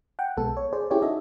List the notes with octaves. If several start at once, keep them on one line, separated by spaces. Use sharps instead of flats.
F#5 G5
B1 G#3 B3 A4
C#5
G#4 C5 D5
C#4 E4 G4 G#4 C#5 D5
D#4 F#4 A4 D#5 E5